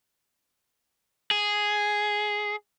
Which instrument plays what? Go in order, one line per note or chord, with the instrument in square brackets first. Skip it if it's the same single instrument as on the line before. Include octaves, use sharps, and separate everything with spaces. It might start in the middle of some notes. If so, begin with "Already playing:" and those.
[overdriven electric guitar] G#4